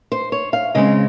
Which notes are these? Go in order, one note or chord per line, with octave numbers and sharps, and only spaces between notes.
C5
C#5
F5
C#3 G#3 C4 D#5